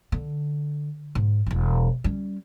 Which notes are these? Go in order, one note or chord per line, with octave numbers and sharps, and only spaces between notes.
D3
G#2
E1 G3
G3 C#4